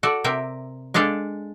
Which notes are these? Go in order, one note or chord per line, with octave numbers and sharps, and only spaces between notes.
F#4 A4 D5
C3 A#4 E5 G5
G#3 D4 A4 F5 G5